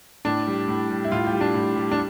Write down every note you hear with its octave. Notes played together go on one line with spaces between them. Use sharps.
A2 D4
G3
A2
G3
E4
A2 F4
G4
G3
D4
A2
G3
D4